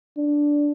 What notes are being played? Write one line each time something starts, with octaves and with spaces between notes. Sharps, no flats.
D4